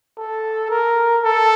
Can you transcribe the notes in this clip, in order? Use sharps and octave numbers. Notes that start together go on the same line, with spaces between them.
A4
A#4
A4